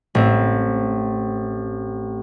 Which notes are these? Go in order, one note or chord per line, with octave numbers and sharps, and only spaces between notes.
A1 C4